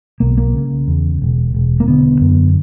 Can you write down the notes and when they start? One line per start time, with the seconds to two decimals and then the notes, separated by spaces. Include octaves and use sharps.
0.20 B1 A#3
0.38 A#3
0.55 C#3
0.88 E2
1.22 E1
1.54 E1
1.80 A#3
1.88 D3 B3
2.21 F#2